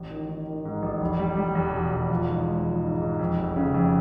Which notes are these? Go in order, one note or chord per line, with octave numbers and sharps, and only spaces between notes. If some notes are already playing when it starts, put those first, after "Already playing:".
Already playing: A1
D#3
D#3
D#3
G#2
A1
F1
G3
G3
E2
B2
E2
F3
G#2
G#3
F3
G#2
G#2
F2
F1
C#3
F2